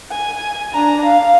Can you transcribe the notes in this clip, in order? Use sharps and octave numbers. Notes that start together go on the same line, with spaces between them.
G#5
D4 A#5
F5